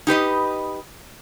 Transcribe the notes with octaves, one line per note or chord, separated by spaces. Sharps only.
D#4 G4 B4 D#5